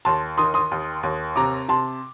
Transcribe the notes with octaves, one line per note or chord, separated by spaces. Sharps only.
D#2 A5 C6
D#3 C6 D#6
C6 D#6
D#2
D#2
C3 A#5 D6
C3 A5 C6